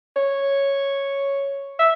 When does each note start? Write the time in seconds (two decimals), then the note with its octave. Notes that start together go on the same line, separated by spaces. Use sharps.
0.16 C#5
1.79 E5